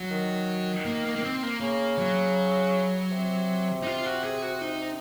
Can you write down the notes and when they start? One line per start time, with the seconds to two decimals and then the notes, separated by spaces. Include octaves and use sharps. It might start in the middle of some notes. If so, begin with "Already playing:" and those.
Already playing: F#3
0.11 D#3
0.85 A#3
1.05 A#3
1.16 A#3
1.23 C4
1.43 A#3
1.60 C#3 A#3
1.98 F#3
3.11 C3
3.82 D#4
3.87 F4
4.06 F#4
4.24 G#4
4.42 F#4
4.61 D#4